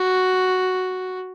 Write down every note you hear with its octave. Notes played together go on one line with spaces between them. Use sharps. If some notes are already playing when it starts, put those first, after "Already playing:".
Already playing: F#4